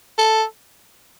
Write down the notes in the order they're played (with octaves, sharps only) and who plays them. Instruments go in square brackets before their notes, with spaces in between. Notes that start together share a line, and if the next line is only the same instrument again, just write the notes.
[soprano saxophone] A4